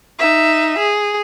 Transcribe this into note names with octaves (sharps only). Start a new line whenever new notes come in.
D#4 E5
G#4